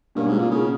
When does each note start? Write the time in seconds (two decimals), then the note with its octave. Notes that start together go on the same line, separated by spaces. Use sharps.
0.15 G2 B2 A#3 C#4
0.28 G#2
0.39 A#2
0.51 C#3